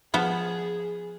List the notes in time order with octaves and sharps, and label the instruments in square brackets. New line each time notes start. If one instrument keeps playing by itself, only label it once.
[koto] F3 B3 [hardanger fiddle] G#4